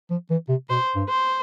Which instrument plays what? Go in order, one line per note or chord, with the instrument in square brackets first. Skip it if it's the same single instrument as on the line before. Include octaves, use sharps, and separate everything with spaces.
[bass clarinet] F3
E3
C3
[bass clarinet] B2 [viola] C5
[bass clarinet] G2
[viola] C5